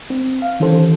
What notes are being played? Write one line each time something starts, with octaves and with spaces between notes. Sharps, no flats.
C4
F5
D#3 E3 C#4 G4 A4 C5